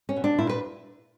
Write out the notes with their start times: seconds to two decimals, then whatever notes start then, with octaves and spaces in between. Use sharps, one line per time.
0.09 C#4
0.16 B2
0.24 D4
0.38 A#2 E4
0.49 B4